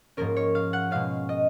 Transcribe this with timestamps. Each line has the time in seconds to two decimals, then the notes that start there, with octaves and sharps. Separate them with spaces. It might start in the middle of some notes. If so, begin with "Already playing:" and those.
0.17 G#2 F3 A#3 C#4 A#4
0.36 C#5
0.55 F5
0.73 F#5
0.91 B2 G#3 C#4 F5
1.29 D#5